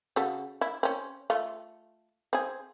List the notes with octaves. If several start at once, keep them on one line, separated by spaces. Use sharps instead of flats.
C#3 F#4 A4
E4
C4 C#4
A3 F4
C4 G#4